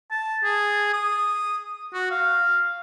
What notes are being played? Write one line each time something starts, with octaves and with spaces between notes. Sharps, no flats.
A5
G#4
D#6
F#4
F5